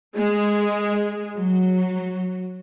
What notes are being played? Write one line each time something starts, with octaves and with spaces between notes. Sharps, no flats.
G#3
F#3